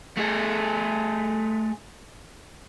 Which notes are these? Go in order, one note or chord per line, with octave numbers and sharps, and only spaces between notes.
A3 G#4